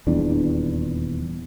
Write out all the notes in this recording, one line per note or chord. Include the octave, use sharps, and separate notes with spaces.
D#1 E2 D4